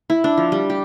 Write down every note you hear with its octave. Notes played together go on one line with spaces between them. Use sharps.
E4
D4
F3
G3
G4